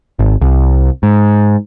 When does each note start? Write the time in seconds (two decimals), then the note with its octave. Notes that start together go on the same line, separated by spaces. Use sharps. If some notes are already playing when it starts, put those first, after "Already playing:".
0.19 G#1
0.41 C2
1.03 G#2